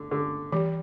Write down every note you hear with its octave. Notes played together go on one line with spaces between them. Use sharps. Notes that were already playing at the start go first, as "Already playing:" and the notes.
Already playing: D3
D3
E3 G3